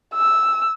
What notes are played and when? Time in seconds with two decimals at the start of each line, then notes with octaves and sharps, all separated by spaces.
0.14 E6